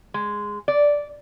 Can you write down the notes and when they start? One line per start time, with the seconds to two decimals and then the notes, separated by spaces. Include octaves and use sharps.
0.14 G#3
0.68 D5